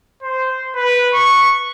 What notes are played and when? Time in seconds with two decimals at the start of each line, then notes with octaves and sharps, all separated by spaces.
0.22 C5
0.76 B4
1.14 C#6